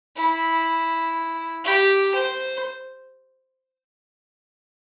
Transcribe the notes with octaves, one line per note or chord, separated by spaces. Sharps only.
E4
G4
C5